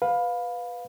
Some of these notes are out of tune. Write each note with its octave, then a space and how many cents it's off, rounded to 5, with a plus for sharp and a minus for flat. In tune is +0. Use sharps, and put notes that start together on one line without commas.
B4 +0 F5 +20